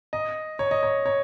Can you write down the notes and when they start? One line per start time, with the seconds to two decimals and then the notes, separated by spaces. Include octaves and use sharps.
0.13 D#5
0.59 C#5
0.71 D#5
0.83 C#5
1.06 C#5